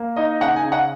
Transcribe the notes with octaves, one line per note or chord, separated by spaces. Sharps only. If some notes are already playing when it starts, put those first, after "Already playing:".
Already playing: A#3
D#4 D#5
C#3 F#5
G#5
C#3
F#5